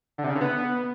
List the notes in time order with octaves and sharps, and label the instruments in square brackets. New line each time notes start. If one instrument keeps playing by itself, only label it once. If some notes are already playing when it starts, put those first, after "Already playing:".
[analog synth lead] D3
C3
C#3
D3
B3